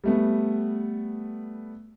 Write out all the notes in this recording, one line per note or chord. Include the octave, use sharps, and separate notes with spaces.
G3 A3 B3